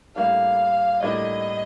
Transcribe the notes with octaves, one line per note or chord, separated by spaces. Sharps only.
A2 G3 A#3 D4 F5
A2 G3 A#3 D4 D#5